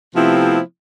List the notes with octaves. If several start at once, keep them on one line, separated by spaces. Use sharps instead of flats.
C3 F3 A3 B3 C4 E4